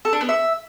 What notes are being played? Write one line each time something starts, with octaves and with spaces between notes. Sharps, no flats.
A4
D4
B3
E5